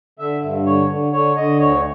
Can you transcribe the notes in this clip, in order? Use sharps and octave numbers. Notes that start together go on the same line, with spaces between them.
D3 E5
G2
D3 C#5
D3
D3 C#5
D3 D#5
D2 C#5